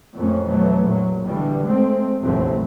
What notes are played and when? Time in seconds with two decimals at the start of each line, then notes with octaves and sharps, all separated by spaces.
0.15 F2 A2 A3 A#3 C#4
0.46 B2 E3 F#3 A3
0.83 A#1 F#3
1.24 B2 D3 E3 G3
1.65 G#3 A3 C4
2.21 F1 A#1 E2 F#3 A3 C4